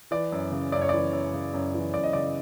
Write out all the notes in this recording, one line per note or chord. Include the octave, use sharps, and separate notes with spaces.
E3 D5
F#2
C#3
F#2 D5
C#5
E3 D5
F#2
C#3
F#2
E3
F#2 D5
D#5
C#3 D5